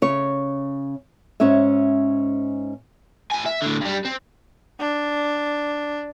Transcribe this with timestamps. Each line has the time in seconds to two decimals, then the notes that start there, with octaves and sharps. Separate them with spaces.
0.02 C#3 C#5
1.40 G#2 C#4 C#5 E5
3.31 A2 G#5
3.46 E5
3.62 A2 D3
3.81 G2 G3
4.05 C4
4.79 D4